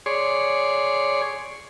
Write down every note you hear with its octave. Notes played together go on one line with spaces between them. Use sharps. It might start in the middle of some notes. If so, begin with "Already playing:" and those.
G#4 C#5 D5 C6